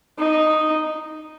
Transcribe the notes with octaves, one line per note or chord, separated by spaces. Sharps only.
D#4